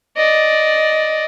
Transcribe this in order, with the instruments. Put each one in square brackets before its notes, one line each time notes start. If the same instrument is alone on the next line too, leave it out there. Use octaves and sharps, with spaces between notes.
[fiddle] D5 D#5